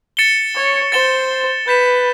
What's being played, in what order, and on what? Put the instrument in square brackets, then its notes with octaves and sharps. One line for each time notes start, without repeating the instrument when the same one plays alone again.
[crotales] A6 C#7 E7 G7
[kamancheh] C#5
[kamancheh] C5 [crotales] A6 C#7 E7 G7
[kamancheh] B4 [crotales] G6 B6 E7